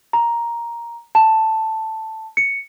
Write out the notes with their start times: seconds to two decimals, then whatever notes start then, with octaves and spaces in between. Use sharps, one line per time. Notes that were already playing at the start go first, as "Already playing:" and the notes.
0.13 A#5
1.15 A5
2.37 C#7